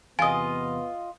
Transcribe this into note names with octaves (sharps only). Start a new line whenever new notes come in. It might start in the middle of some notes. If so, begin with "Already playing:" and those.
E2 C3 B3 F4 D#5 G#5 D#6